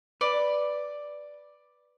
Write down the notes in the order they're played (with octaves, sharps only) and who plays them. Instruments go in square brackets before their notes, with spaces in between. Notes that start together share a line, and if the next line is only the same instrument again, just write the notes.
[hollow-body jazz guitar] B4 [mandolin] D5